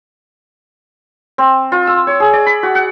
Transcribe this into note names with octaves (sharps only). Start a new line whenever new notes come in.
C4
F4
E6
C#5
G#4
D5
B5
F#4
F#5